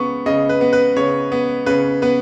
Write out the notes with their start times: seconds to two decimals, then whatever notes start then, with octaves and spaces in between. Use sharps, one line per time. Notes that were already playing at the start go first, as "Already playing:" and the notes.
Already playing: C#3 B3 C#6
0.26 C#3 D#5
0.49 B4
0.61 B3
0.73 B4
0.96 C#3 C#5
1.32 B3
1.66 C#3 B4
2.02 B3 B4